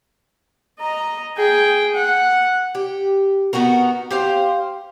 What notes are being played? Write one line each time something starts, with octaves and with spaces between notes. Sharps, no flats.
D#5 A#5
G#4 G5
F#5
G4
B3 D#4 F#4 A#4
G4 C5 F5